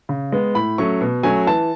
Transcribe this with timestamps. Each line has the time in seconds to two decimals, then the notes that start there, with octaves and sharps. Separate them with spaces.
0.09 C#3
0.32 G#3 B3
0.55 A2 B5
0.78 F#3 A3 C#4 C#6
1.01 B2
1.23 F#3 A3 C#4 G#5
1.47 E3 A5